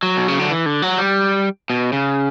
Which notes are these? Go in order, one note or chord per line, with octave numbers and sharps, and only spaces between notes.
F#3
B2
C#3
D3
E3
D3
F#3
G3
B2
C#3